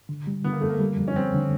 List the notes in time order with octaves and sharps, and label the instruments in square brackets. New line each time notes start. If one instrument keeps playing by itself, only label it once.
[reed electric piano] D3
G3
[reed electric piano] D3 [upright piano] B3
[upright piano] A#3
[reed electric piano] F2 [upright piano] A3
[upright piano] A#3
[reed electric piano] G3
F2
[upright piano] C#4
[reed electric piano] F2 [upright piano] C4
[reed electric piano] D3